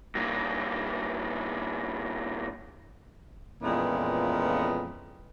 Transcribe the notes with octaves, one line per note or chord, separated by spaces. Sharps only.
G2 A#2
F2 A#2 E3 G#3 B3 C#4